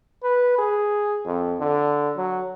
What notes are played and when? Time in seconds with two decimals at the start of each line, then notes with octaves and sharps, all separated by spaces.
0.23 B4
0.58 G#4
1.25 F2
1.60 D3
2.17 F#3